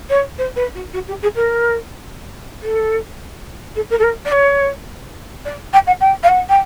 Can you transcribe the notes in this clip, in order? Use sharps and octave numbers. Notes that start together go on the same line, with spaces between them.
C#5
C5
B4
F#4
F#4
G4
G#4
A#4
A4
A4
A#4
A4
A#4
D5
C#5
D5
G5
F#5
G5
F5
F#5
G5